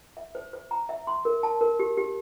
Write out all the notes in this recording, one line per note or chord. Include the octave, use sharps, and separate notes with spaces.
E5
C5
C5
A#5
E5
C6
A#4
A5
A#4
G4
G4